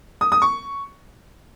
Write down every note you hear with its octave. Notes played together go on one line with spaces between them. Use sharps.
D#6
D#6
C#6